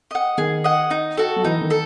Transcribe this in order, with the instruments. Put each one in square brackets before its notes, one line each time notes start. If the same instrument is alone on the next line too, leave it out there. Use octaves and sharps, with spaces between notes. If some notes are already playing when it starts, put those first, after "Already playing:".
[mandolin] D#5 F#5
[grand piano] D#3 [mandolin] G#4
[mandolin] D#5 F#5
D#4
F#4 A4
[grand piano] F#3
[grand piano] E3 [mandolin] D#4
[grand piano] D#3
[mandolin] A4